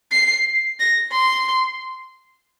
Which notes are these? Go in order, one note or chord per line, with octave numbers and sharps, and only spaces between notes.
C7
A#6
C6